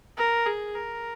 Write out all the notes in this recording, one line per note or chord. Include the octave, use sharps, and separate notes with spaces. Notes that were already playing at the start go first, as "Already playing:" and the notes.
A#4
G#4
A#4